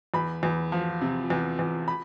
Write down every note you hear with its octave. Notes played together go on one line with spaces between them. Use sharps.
E2 B5
E2
F3
C3
E2
E2
B5